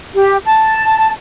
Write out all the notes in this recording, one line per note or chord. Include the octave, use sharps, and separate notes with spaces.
G4
A5